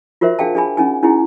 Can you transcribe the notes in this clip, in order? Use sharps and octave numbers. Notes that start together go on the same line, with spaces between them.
F4 F#4 A#4 C5 E5
D4 G#4 F5 G5 A5
D4 G#4 G#5 B5
C#4 D#4 G#5
C#4 D#4 E4 F#4 G#4